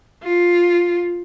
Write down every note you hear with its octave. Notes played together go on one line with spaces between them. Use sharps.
F4